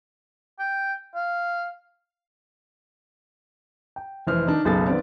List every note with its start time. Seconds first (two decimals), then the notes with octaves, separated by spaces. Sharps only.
0.59 G5
1.15 F5
3.96 G5
4.27 F1 E3 C5 F6
4.47 D#3 D4 D#4
4.65 F#1 B1 G#4 A4 A6
4.87 D#3 B3 C4 D5